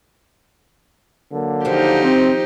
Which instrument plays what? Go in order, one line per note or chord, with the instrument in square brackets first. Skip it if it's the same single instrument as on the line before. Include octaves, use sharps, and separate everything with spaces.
[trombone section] D3 F#3 A#3
[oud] D#2 F3 [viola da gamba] D#4 G4
[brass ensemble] C4